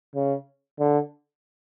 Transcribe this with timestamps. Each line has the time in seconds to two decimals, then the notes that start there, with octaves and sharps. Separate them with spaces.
0.15 C#3
0.79 D3